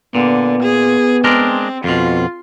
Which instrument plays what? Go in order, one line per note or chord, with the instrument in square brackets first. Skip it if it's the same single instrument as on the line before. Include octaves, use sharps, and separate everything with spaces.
[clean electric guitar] A#2 [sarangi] D3 [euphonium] B3
[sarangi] G#4
[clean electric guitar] G#3 D4 A#4 [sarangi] C4
[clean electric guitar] F2 B2 [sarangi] F4